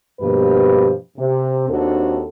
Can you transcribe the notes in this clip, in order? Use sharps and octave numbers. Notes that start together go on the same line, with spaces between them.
G2 B2 F3 A#3 G4 B4
C3
D#2 C4 D4 F#4 A4